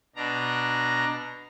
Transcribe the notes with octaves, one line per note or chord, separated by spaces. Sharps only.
B2 D4 A#5